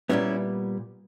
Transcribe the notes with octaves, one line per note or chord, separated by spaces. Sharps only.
A#2 G3 B3 C#4 E4